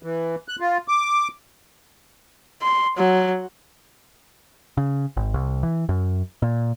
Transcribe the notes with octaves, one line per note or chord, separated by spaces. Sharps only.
E3
F#6
F4
D6
C6
F#3
C#3
G#1
C2
E3
F#2
A#2